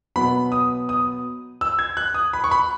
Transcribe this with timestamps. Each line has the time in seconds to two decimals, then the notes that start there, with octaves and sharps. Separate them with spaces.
0.16 B2 F#3 B3 B5
0.52 D#6
0.89 D#6
1.61 E6
1.79 G#6
1.97 F#6
2.14 D#6
2.33 B5
2.44 C#6
2.51 B5